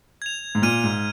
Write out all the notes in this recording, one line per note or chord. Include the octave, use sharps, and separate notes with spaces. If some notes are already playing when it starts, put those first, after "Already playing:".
G#6 F7
G#2
A#2 F6 G#6 D#7
G#2